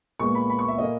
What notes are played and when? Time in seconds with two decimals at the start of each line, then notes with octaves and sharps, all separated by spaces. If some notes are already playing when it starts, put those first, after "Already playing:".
0.20 A#2 G#3 B3 C#6
0.35 B5
0.50 B5
0.59 C#6
0.68 E5
0.78 A#2 A#3 D#5